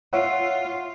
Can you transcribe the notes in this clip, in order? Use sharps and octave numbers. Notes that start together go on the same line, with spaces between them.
F4 C#5 E5 F#5